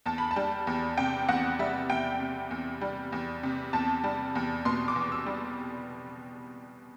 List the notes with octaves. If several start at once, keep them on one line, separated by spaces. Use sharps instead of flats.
E2 A5
B5
A5
G3
E2
C3 G5
E2 F#5
G3 E5
E2 G5
C3
E2
G3
E2
C3
E2 A5
G3
E2
B2 C6
D6
E2
E6
G3